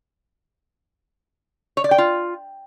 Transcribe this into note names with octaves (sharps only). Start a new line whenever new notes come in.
C#5
D5
G5
F4